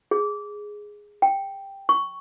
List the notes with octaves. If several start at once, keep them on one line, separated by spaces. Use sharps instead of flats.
G#4
G5
C#6